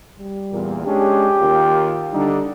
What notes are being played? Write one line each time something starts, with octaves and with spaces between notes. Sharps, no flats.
G3
E2 A#2
G#3 C#4 D4 G4
D#2 F4 A#4
D3 G3 D4 D#4